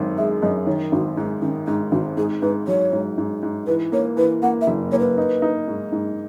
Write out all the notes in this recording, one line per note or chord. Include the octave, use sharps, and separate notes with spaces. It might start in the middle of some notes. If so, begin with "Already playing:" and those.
Already playing: G#1 F#2
G#3 E5
F#2 D#5
D#3 C#5
G#1 F#4
G#2 D#4
D#3 C#4
G#2 D#4
G#1 F#4
G#2 G#4
G#2 B4
F#3 C#5
G#2
G#2
G#2
E3 B4
A#3 C#5
E3 B4
A#3 F#5
E5
F#1
A#3 C#5
B4
D#4
D#4
G#2
G#2